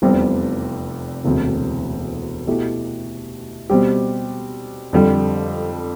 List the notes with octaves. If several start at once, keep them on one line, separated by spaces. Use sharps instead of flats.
F1 E2 C3 G3 C4
E1 D2 C3
B2 A3 E4 G4
B2 G3 C4 G4
F2 D3 G3